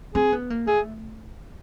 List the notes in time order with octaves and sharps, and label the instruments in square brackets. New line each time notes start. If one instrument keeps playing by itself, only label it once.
[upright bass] C4 [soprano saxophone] G#4
[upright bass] B3
A#3
[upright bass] A3 [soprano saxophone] G#4